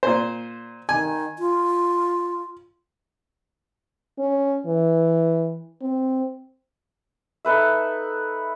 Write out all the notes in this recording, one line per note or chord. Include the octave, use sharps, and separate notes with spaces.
A#2 C5
D#3 G#5
F4
C#4
E3
C4
D#4 A4 B4 E5